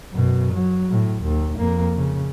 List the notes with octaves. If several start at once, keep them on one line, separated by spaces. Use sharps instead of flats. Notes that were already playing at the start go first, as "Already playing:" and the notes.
F#2 B2
F#3
A2
D#2
F2 A#3
C#3